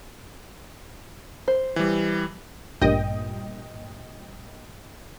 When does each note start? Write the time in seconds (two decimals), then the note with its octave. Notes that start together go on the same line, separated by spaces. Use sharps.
1.48 C5
1.76 E3 G3
2.81 A1 G2 A#2 D#5 G5